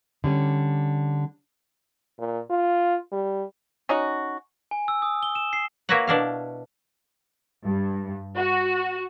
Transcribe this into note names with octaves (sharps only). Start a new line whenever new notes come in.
D3 G3 C#4
A#2
F4
G3
C#4 D#4 F#4
G#5
E6
D#6
G7
E7
C7
A#3 E4 F#4 B4 C#5 F#5
B2 D4 E4 F5
G2
F#4